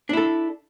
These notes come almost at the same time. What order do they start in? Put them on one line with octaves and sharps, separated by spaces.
D4 E4 A4